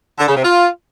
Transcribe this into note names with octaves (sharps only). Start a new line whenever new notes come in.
D3
C#3
C3
F4